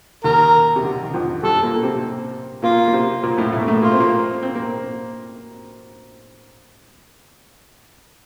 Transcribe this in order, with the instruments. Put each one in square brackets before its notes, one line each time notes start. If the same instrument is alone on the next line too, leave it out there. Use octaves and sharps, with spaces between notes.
[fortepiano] D#2 D#3 [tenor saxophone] A#4
[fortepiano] C3
D3
D#3
F2 F3
[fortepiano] G2 G3 [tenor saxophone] A4
[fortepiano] A#2 A#3
C3 C4
[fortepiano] A#2 A#3 [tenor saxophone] F4
[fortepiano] A#3
C3 C4
A#2 A#3
A2 A3
A2 A3
A#3
A2 A3
[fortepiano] A#3 [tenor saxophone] F4
[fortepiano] C4
A#2 A#3
C4
A#3